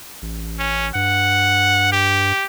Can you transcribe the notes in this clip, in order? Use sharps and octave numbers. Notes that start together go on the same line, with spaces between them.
A1
C#4
G2 F#5
G4